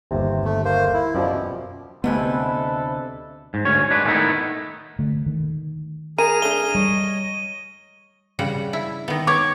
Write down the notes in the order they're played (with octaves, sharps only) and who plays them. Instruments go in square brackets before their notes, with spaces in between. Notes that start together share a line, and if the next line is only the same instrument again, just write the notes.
[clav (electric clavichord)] G1 D#2 [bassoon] C3
[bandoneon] A3
[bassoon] A#3 [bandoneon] C5
[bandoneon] E4
[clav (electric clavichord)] F#2 G4 D5 [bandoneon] B2 [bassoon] F3
[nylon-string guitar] D2 C3 G#5 [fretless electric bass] B3 [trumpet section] E4 A4 B4 [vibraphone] D#5
[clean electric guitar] G#2
D2 C#4 C#5
G#3 D4 B4
D#3 G3 A3 B3 D#4 E4
[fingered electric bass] D3 A3
D#3
[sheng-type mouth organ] G#4 A#5 F6 [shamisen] A#4 [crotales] D#7
[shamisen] A3 D4 [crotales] G7
[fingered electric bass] G3 [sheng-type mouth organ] C#5 D#5
[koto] C#3 G3 F#5
E4
D#3 B3
[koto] B3 C#5 [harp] C#6 D6 G#6